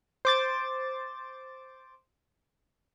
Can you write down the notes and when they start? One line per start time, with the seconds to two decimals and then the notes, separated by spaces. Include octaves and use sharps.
0.25 C5 D6 A6